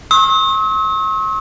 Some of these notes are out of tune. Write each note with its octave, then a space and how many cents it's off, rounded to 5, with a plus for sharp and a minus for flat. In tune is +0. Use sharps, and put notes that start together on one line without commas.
C#6 -45 E6 -45